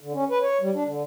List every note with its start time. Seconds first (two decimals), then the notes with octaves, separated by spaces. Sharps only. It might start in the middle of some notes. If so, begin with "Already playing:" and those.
0.01 D3
0.13 C#4
0.31 B4
0.42 C#5
0.61 G3
0.75 D4
0.86 D3